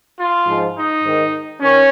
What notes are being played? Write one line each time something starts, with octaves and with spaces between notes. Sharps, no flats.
F4
G#2 F3
D#4
G#2 D#3
D#3 C#4